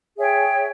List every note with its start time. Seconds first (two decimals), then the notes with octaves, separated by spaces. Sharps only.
0.16 G#4 C#5 E5 G5